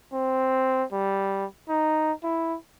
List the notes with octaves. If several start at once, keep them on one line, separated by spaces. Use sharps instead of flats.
C4
G3
D#4
E4